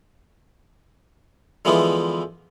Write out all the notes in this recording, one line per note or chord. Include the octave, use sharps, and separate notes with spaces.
D3 E3 F3 G#3 B3 E4